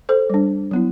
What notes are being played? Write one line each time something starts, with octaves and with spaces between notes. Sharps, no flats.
A4 C5
G3 D4
F#3 B3 E4